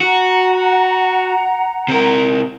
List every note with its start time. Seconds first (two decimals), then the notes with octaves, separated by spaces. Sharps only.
0.01 F#4 F#5 A#5
1.88 C3 A#4